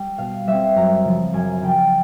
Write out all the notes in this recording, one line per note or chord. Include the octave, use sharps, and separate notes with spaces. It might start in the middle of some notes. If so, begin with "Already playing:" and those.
Already playing: G3
B2 F5
G3 C4 E5
F#2 A#5
C#3 F3
F#2 G#5
C#3 F3 G5